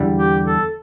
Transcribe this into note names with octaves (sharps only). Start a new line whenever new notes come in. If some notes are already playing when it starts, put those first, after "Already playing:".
Already playing: E2 D3 G3
G4
A4